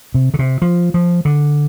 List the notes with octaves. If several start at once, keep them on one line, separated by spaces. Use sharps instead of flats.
C3
D3
C3
F3
F3
D3